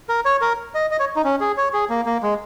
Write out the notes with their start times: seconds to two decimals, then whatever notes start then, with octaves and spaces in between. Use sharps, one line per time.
0.09 A#4
0.25 C#5
0.41 A#4
0.75 D#5
0.91 D#5
1.00 C#5
1.16 D#4
1.24 C#4
1.41 G#4
1.57 C#5
1.73 G#4
1.90 A#3
2.06 A#3
2.23 G#3